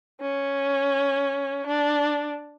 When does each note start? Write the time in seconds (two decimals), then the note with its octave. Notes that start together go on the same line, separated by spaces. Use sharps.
0.21 C#4
1.67 D4